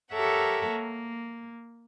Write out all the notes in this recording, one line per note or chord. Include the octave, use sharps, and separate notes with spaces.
G4 A4 A#4 C#5 E5 F#5
A#3